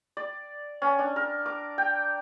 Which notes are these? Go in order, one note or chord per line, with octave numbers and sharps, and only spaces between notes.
D5
C#4
D4
A#4
D6
G5